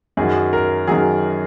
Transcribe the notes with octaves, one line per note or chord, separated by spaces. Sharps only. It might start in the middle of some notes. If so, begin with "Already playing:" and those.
F#2 D#3 F#3 G#4
A#4
F#2 D#3 F#3 G#4